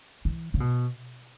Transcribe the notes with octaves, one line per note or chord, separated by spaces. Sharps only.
E3
C#3
B2